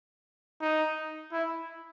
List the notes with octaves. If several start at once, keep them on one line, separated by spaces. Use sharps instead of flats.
D#4
E4